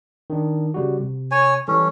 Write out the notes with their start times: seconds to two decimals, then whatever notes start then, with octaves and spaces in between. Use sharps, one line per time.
0.30 D#3 D4
0.74 C#3 G3 F#4
1.00 C3
1.31 C#5 G#5
1.68 E3 G3 C#4 A4